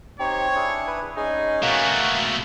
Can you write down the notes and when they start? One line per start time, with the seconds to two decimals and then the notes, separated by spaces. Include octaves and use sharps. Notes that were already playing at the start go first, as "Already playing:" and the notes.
0.20 C4 D#4 G4 C#5
0.55 D4 E4 G#4
0.88 B4
1.17 G#3 C#4 D#4 G#4 G#5
1.63 B2 A3 A#3 F#4
1.95 E6